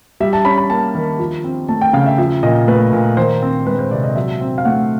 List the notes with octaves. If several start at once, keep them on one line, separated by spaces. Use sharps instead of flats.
G3 E5
A5
C#4 B5
B5
A#3 A5
D#3
F3
C4
A3 A5
G5
C#3 F5
E5
F3 E5
A#2 D#5
A3 B4
A#2
D#3 C5
C4
G#3 B4
C5
C3 D5
D#5
F#3 E5
C4
F5
A3 F#5